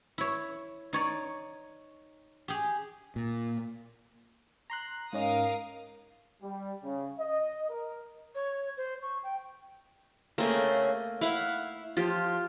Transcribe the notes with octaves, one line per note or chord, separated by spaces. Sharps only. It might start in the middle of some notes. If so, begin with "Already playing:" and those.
E4 C#5
D#4 C#5 D5
G4 G#4
A#2
A#5 C6 F#6
G#2 C#4 A#4 D#5 F5 D#6
G3
C#3
D#5
A#4
C#5
C5
C#6
G5
C#3 A3 A#3 C4 C#4
E4 F5 F#5 B5
F3 F4 G4